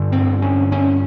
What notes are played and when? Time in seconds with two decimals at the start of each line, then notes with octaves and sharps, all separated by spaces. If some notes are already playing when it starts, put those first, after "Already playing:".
Already playing: G2 D3
0.12 C4
0.42 C#4
0.72 C#4